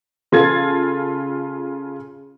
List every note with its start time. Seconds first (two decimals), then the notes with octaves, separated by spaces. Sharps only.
0.32 C#3 F4 A4 G#6 A6